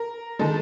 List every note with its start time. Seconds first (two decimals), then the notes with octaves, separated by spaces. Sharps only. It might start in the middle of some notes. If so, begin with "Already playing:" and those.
Already playing: A#4
0.39 D#3 G#3 A4